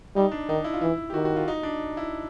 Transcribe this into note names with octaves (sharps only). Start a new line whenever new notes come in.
G3 D#4
D4
D#3 D#4
E4
F4
E3 E4
G4
D#3 F#4
F#4
F4
D#4
D4
E4